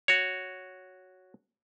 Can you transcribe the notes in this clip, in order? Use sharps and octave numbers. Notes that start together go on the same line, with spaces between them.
F#4 C#5